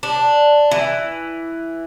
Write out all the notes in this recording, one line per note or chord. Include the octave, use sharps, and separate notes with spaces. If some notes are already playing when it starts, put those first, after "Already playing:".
D4
E3